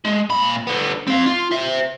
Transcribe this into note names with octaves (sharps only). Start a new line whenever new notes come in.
G#3
A#2 B5
D3 B3
C4 F5
F4
C5 E5